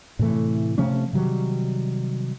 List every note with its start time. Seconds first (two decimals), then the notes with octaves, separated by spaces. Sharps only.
0.19 A2 C3 E3 A3
0.78 C3 F3 A3 C#4
1.13 C3 D#3 F#3 G3